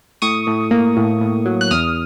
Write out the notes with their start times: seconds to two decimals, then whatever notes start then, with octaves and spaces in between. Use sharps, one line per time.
0.22 A2 C#6 D#6
0.47 A2
0.71 A#3
0.97 A2
1.21 A2
1.46 F#3
1.61 F#6
1.71 E2 D#6 F6